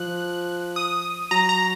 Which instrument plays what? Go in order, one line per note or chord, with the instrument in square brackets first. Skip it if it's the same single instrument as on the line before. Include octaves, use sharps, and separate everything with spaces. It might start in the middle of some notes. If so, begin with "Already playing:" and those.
Already playing: [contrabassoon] F3 [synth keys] F#6
[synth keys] D#6
[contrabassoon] F#3 [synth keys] A#5
[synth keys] A#5